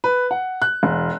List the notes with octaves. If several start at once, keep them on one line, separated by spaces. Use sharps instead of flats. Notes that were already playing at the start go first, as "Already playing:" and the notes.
B4
F#5
F#6
E1